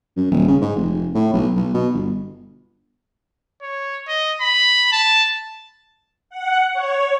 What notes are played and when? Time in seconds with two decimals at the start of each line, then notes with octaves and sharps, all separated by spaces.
0.17 F#2
0.31 D#1
0.48 C#3
0.61 G#2
0.76 F1
1.15 A2
1.33 B1
1.56 B1
1.74 B2
1.94 G1
3.62 C#5
4.08 D#5
4.41 B5
4.92 A5
6.30 F#5
6.73 C#5